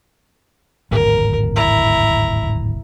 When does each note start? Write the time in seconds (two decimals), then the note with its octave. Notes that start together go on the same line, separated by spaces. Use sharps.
0.91 D1 G#1 E2 A#4
1.56 E4 A#5